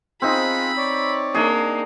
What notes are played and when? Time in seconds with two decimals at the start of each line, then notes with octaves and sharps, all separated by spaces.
0.22 C4 D#4 F4 G#4 B5 F#6
0.77 C#5 D5
1.35 A#3 D4 D#4 G#4